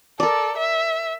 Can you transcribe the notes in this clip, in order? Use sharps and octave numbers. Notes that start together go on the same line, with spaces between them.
A4 A#4 D5
E5